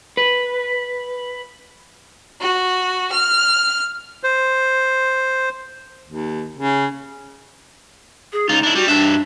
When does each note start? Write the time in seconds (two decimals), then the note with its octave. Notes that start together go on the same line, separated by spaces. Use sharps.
0.17 B4
2.40 F#4
3.11 F6
4.23 C5
6.06 D#2
6.57 C#3
8.33 G#4
8.49 C#2 D#4 F4
8.63 D4 E4
8.75 G3 F#4
8.88 G2 D4 E5